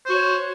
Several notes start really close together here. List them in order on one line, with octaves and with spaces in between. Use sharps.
C5 F#4 C#5